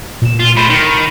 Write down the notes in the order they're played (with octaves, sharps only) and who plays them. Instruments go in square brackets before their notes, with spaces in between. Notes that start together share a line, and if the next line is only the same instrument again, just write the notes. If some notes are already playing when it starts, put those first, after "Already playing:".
[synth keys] A#2 E7
[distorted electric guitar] F4
[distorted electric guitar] A2 C5 [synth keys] B5 A6
[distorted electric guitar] D#3
[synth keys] B5